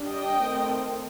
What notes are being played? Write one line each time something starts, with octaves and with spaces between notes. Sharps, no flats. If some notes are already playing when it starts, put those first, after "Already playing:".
Already playing: G3 D4
D#5 G5
D#3 A3 C4